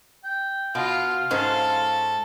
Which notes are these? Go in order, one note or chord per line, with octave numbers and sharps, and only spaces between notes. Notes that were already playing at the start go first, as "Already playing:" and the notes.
G5
B2 F4 F5
G#2 C#4 A4 C5